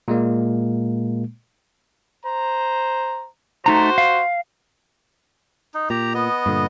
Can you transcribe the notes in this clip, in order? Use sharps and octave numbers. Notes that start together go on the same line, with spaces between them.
A#2 G#3 A#3
C5 A#5
A3 D#4 F#4 C5 A#5
F5
D#4
A#2 G4 A#5
B3 D#5
G2 A#2 D3